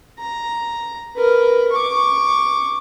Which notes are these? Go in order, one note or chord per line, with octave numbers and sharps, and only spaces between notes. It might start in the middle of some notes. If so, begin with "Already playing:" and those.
A#5
A#4 B4
C#6 D6